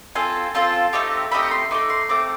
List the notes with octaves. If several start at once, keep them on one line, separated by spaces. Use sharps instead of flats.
C4 F4 A4 G#5
C4 F4 A4 A5
A3 C4 D#4 G4
A3 C4 D#4 G4 B5
C#6
C6
A3 C4 D#4 D6
C6
A3 C4 D6